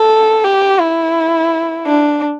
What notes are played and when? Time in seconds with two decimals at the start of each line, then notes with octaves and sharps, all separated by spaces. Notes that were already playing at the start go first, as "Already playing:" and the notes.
Already playing: A4
0.44 G4
0.80 E4
1.86 D4